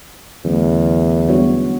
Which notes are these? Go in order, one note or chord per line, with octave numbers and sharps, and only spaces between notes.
E2 D3 F#3 A3 C#4
G3 B3 D4 F#4 C#5